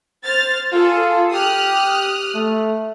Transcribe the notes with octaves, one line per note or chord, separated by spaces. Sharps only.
C5 F6 A6
F4 G#4 A4
G4 D#6 F6 F#6
A3